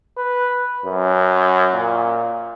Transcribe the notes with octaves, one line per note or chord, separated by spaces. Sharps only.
B4
F#2
A#2